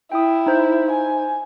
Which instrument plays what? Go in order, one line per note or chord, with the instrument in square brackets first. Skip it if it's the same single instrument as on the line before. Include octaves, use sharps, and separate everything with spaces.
[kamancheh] E4 [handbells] G5 D#6
[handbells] D#4 C5 G6
[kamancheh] G#5